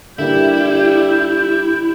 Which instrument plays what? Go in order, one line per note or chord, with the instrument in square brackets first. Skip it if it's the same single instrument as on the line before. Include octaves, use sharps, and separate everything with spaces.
[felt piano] D3 A#3 [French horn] G3 [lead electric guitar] E4 [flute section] G4 G6